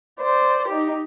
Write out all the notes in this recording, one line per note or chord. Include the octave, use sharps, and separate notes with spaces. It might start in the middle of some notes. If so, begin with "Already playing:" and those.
C5 D5
D#4 G4